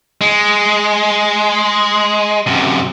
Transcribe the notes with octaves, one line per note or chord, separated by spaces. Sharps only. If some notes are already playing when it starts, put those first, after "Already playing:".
G#3
F#2 C3